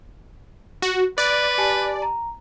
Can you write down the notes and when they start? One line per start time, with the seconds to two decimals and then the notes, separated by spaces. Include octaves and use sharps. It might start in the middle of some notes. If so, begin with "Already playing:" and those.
0.82 F#4
1.18 B4 D5 F#6
1.58 G4 G#5 A5
2.02 A#5